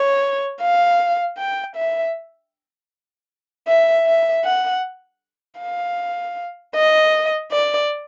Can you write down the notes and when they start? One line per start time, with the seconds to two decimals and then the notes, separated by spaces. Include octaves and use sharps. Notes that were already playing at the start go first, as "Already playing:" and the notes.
Already playing: C#5
0.61 F5
1.38 G5
1.76 E5
3.68 E5
4.06 E5
4.45 F#5
5.60 F5
6.75 D#5
7.52 D5